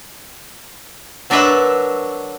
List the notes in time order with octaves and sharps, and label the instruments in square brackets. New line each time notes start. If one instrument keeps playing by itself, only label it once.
[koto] F#3 D4 A#4 B4 E5